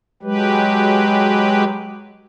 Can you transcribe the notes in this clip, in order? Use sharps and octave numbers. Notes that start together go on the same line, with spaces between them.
F#3 G#3 G4 B4